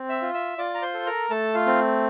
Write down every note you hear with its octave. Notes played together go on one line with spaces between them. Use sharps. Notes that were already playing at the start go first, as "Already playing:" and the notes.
Already playing: C4
E5 E6
F4
E5 E6
F4 D5 D6
A#5
C5 C6
A4
A#4 A#5
A3 A4 A5
F4 F5
C4